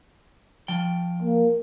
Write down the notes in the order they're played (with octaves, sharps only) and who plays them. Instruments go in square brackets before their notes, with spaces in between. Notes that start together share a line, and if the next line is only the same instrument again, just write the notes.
[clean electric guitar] F3 G5
[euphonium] A#3